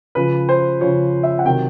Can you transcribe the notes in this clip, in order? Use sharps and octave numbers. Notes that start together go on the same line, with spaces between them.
C#3 F3 B4
C5
C#3 F3 C#5
E5
F#5
C3 D#3 F#3 G5